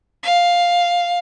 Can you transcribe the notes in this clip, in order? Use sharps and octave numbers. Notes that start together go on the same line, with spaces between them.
F5